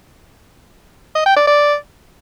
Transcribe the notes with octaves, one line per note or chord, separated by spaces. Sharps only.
D#5
G5
D5
D5